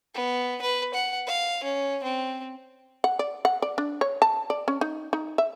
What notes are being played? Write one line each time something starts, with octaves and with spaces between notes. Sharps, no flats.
B3
B4
F#5
F5
C#4
C4
F#5
D5
F#5
D5
D4
C#5
A5
D5
C#4
D#4
D#4
E5